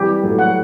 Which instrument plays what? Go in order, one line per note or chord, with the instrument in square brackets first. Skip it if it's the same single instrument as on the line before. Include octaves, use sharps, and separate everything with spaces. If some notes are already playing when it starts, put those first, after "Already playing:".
Already playing: [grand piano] E3 G3 [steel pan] G4
[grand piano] F#3 A3
[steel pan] F#5
[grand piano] A3